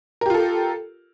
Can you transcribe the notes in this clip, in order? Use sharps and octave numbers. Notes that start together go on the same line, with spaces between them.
F4 G4 A4 A#4